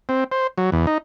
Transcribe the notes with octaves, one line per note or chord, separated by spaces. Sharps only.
C4
C5
F#3
E2
D#4